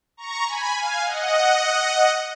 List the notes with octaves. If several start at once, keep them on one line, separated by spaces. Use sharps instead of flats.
A#5 C#6
G#5 B5
F5 G#5
D#5 F#5